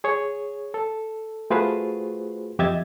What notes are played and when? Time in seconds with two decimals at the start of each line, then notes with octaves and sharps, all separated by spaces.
0.04 G#4 C#5
0.74 A4
1.50 A3 F4 F#4 G#4 B4 C5
2.59 F2 G4 D#5 E5 G#6 A6